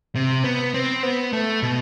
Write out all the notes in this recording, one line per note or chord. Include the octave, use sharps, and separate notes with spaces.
C3
B3
C4
B3
A3
B2